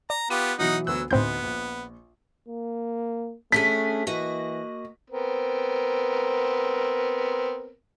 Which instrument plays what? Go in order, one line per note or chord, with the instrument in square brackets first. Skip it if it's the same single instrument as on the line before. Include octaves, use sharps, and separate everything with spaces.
[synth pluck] D5 [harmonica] A#5
[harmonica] B3 F4 G4 [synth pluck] D#7
[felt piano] B2 E3 F#3 [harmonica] D#4 F#5 D#6
[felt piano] D2 B3 [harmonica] F#3 E6 [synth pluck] F#6
[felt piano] D2 D#4 C6 [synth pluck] A2 C4 G6 [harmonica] B3
[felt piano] A#1
[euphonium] A#3
[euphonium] A3 [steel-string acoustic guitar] C#4 D4 G#4 [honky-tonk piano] B6
[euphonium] E3 [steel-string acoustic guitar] A#3 F#4 D#5
[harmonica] B3 C4 A#4